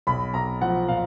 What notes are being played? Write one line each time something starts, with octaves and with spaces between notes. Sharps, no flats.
B1 B5
B1 A#5
F3 F#5
A#2 F5